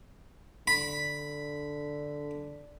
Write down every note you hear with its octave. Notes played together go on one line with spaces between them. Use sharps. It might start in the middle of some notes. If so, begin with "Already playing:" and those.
D3 B5